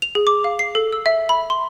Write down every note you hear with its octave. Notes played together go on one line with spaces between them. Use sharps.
F7
G#4
D6
F5
C7
A4
E6
E5
B5
C6